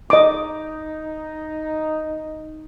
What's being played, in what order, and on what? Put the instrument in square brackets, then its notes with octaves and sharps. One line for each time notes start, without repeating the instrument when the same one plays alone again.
[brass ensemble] D#4 [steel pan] D#5 D6